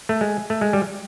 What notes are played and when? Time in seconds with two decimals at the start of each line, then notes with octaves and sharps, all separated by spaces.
0.09 A3
0.21 G#3
0.50 A3
0.61 G#3
0.73 G3